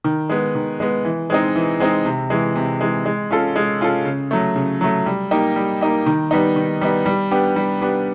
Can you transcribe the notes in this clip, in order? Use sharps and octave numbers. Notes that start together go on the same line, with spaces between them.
D#3
G#3 B3
D#3
G#3 B3
E3
G#3 C4 D#4
E3
G#3 C4 D#4
C3
E3 G#3
C3
E3 G#3
G#3
C#4 F4 A4
G#3
C#4 F4 A4
C#3
F#3 A3
C#3
F#3 A3
G3
A#3 D#4 G4
G3
A#3 D#4 G4
D#3
G3 B3 D#4
D#3
G3 B3 D#4
G3
B3 D4 G4
G3
B3 D4 G4